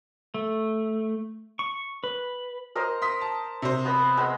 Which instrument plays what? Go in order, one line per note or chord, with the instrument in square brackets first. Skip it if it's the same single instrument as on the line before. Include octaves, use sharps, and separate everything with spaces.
[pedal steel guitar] A3
C#6
B4
[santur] A#4 C5 D#5
[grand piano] C6 D#6 B6
A5
C3 C5
[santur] B3 D#5 B5
G#3 B3 B5